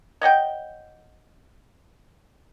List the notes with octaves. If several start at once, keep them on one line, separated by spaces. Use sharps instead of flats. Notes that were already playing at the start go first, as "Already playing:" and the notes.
C#5 D#5 F#5 G5